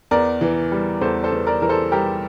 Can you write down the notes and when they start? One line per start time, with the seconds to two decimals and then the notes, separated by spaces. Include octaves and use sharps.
0.11 E2 A#4 D5
0.41 E3
0.72 G3
1.01 E2 A4 C5
1.24 A4 C5
1.32 E2
1.47 A#4 D5
1.62 E3 A#4
1.69 A4 C5
1.92 G3 G4 A#4